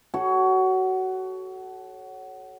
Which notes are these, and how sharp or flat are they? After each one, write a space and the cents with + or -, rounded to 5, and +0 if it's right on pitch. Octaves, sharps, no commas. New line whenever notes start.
F#4 +20 A4 -25 C#5 +0